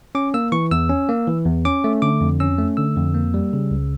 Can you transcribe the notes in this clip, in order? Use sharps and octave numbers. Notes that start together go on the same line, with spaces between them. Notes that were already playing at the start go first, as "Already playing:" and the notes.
C#4 D6
A#3 E6
E3 C#6
E2 E6
C#4
A#3
E3
E2
C#4 D6
A3
D3 D6
F2
C#4 E6
A3
D3 E6
F2
A#3
G3
C#3
C#2